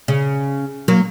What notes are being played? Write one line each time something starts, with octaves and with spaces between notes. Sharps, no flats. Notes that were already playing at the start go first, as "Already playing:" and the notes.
C#3
F#3 A#3